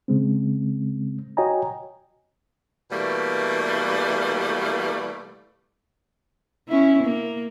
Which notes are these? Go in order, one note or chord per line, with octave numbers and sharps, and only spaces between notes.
C#3 G#3 C4
F#4 C#5 D#5 G5 G#5 A#5
B2 E3 G3 A3 A#3
C#4 E4
A#3